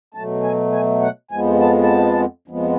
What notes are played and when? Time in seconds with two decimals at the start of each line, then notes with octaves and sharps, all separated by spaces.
0.14 B2 F#3 A3 A5
0.43 G#5
0.73 G#5
1.02 F#5
1.31 F2 F3 G#3 B3 G#5
1.60 A5
1.83 A5
2.48 F2 F3 G#3 B3